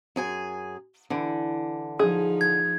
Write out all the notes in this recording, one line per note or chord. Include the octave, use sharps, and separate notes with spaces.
F#2 G#4 G#5
D3 E3
F3 D#4 G#4
G#6